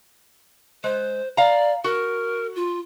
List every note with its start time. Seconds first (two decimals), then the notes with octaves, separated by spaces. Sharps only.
0.84 G#3 C5
1.37 D5 F5 A#5
1.84 F#4 A#4
2.56 F4